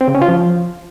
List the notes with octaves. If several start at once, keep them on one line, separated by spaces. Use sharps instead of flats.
C4
C#3
C#4
F4
F3